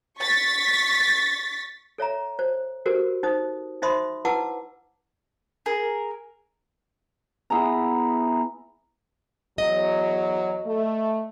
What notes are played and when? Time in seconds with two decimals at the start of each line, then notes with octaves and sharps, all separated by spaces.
0.19 C#6 A6 B6
1.98 A4 C#5 E5 A#5
2.39 C5
2.86 F#4 G4 A4 A#4 C5
3.23 D#4 C5 D#6
3.82 D#4 C5 E5 B5 C6 D#6
4.25 E4 B4 F#5 A5 D6 E6
5.66 G#4 A#4
7.50 B3 E4 G#4 A#5
9.58 E2 F#3 D#5
10.65 A3